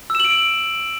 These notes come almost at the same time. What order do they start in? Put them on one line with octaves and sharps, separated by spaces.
E6 E7 F#7 D7